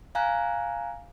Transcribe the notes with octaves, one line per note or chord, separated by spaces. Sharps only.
F5 G#5 A#5 F#6